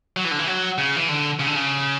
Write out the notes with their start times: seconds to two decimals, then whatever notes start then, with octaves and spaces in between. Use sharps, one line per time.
0.17 F#3
0.24 E3
0.31 D3
0.39 E3
0.47 F#3
0.78 C#3
0.96 E3
1.09 D3
1.40 C#3
1.46 D3
1.55 C#3